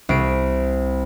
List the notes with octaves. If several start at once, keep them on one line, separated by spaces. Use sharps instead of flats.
C2 C7 D7